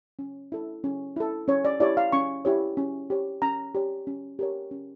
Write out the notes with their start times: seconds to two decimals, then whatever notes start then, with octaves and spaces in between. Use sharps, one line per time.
0.19 C#4
0.52 E4 A4
0.84 C#4
1.16 E4 A4
1.48 C#4 C#5
1.65 D5
1.80 E4 G4 C#5 D5
1.97 F5
2.12 C#4 C#6
2.45 E4 G4 C#5
2.77 C#4
3.10 G4 C#5
3.42 C#4 A#5
3.75 G4 C#5
4.07 C#4
4.39 G4 A#4 C#5
4.71 C#4